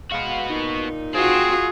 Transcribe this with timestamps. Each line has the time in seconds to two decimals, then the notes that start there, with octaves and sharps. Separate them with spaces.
0.12 B2 G#3 B3 F#4 F5
0.49 A#2 D#4
1.14 C4 F4 F#4 G#4